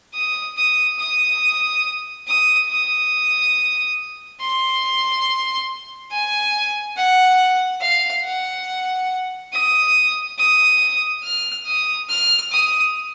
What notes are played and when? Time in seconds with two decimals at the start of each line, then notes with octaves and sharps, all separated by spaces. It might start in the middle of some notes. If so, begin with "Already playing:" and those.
0.14 D#6
0.57 D#6
0.99 D#6
2.27 D#6
2.70 D#6
4.41 C6
6.12 G#5
6.97 F#5
7.82 F5
8.25 F#5
9.53 D#6
10.39 D#6
11.23 F6
11.66 D#6
12.10 F6
12.51 D#6